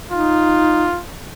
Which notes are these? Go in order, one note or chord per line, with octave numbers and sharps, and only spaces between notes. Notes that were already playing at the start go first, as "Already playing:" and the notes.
D#4 F4